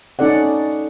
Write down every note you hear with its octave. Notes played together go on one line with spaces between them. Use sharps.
C#4 D#4 A4 D5 F#5